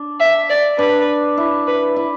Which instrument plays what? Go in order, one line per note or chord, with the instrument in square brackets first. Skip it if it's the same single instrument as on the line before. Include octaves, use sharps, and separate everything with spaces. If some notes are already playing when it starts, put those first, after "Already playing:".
Already playing: [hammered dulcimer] D4
[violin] E5
D5
[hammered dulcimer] D4 [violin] B4
[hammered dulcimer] E4
[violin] B4
[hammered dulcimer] E4